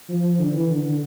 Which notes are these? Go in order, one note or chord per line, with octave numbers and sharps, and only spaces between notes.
F3
F3
D3
E3
D3
D3